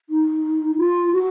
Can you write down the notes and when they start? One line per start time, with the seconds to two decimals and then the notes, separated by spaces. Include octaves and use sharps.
0.09 D#4
0.78 F4
1.13 F#4